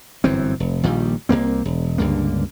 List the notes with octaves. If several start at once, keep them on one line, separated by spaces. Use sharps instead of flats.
G1 F#2 E3 C4
F1
A#1 A#2 D#3 G3
C2 G#2 A#3 C4
E1
C#2 G2 D3 A#3